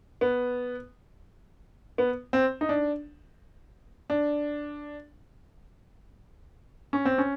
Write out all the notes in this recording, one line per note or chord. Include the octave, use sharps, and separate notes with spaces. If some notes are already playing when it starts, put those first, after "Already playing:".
B3
B3
C4
D#4
D4
D4
C#4
C4
C#4